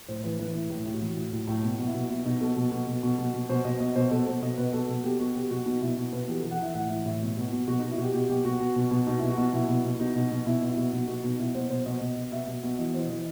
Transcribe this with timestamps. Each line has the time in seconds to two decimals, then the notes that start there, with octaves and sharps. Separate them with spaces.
0.08 A2 C5
0.24 E3 B4
0.39 E3 B4
0.55 A2 E4
0.70 A2 E4
0.86 A2
0.94 F#4
1.01 E3
1.17 A2
1.33 A2
1.47 A2
1.63 B2
1.79 B2
1.87 E4
1.94 B2
2.10 B2 E4
2.25 B2 D#4
2.41 B2 A4
2.56 B2
2.72 B2
2.87 B2
3.03 B2
3.18 B2
3.34 B2
3.50 B2 C5
3.64 B2 D#5
3.80 B2 D#5
3.96 B2 C5
4.11 B2 A4
4.27 B2 C5
4.42 B2 D#5
4.58 B2 B4
4.73 B2 A4
4.88 B2 A4
5.04 B2 G4
5.20 B2 F#4
5.35 B2 G4
5.51 B2 F#4
5.66 B2 D#4
5.81 B2 E4
5.97 B2 F#4
6.13 B2 B4
6.28 E3 G4
6.40 A4
6.43 E3
6.51 F#5
6.59 E3 E5
6.74 A2 F#5
6.90 E3 E5
7.06 A2 E5
7.21 B2
7.37 B2
7.52 B2
7.68 B2 F#4
7.79 D#4
7.83 B2
7.91 E4
7.98 B2 F#4 G4
8.14 B2 G4
8.29 B2 G4
8.45 B2 F#4
8.60 B2
8.76 B2
8.91 B2
9.07 B2 D#4
9.19 E4
9.22 B2
9.30 F#4
9.38 B2
9.53 B2 E4
9.69 B2
9.84 B2
10.00 B2 D#4
10.16 B2
10.31 B2
10.46 B2 E4
10.62 B2
10.69 E4
10.77 B2
10.93 B2 D#4
11.08 B2 F#4
11.24 B2 D#4
11.39 B2 E4
11.55 B2 C5
11.70 B2 C5
11.86 B2 D#5
12.01 B2
12.16 B2
12.32 B2 E5
12.48 B2
12.63 B2
12.79 E3 D#5
12.94 E3 C5
13.10 E3 D#5